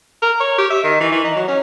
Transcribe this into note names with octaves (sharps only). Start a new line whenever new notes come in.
A#4
C#5
G4
E5
D#3
E3
E3
D#4
F#3
C#4